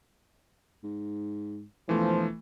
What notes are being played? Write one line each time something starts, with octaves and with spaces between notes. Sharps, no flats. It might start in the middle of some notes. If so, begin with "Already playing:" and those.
G#2
E1 E3 F3 A3